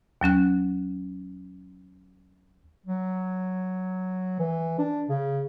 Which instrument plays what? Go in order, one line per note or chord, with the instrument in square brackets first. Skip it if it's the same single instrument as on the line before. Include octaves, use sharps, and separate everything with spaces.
[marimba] D#2 F#3 C#4 F#6
[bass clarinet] F#3
E3
D4
C#3